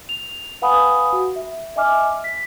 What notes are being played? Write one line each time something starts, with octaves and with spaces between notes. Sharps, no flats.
F7
B4 F5 F#5 G#5 B5 D#6
F#4
E5
D#5 E5 G#5 D6 F6
B6